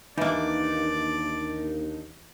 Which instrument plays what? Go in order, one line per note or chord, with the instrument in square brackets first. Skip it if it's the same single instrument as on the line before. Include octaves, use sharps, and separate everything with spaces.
[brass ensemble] D#2 [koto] E3 A#3 [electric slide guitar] D4 D#4 [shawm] D5